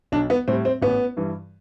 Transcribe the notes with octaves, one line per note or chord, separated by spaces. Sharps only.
B1 D4
B3
A2 G3 C4
C4
A1 B3
G2 E3 G3